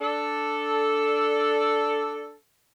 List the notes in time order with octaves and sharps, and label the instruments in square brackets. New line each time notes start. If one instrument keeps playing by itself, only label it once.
[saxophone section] D4 A4